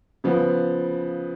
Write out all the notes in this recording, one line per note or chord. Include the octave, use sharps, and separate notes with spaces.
C#3 F3 B3